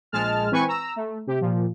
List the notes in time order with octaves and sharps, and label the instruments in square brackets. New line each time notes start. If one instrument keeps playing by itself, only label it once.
[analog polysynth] A#1 G#3 A5 F6
E3 C4 B4 G#5 C#6
A#5 E6
A3
C3 G4
A#2 F3